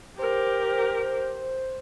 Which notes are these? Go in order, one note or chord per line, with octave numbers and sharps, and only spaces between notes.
G4 A#4 C5